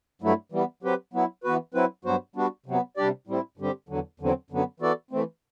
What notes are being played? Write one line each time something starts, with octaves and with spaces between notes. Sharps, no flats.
G2 F#3 A3 E4
E3 G3 B3
F#3 C4 G4 B4
F#3 B3 E4
E3 B3 F#4 B4
F#3 C4 E4 B4
G2 F#3 B3 F#4 C5
G3 B3 D4 F#4
C3 F#3 B3
C3 G3 D4 G4 D5
A2 G3 C4 E4
G2 D3 G3 C4 G4
E2 D3 F#3
E2 D3 F#3 C4
F#2 D3 F#3 B3
E3 B3 F#4 A4 D5
E3 A3 C4